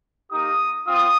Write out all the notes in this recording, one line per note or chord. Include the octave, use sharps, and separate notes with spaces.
A#3 D#4 G4 D#6
C4 F4 D#6